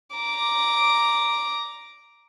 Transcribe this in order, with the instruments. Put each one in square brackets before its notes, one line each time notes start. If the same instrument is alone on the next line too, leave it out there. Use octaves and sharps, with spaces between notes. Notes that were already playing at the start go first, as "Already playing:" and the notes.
[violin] A#5 D6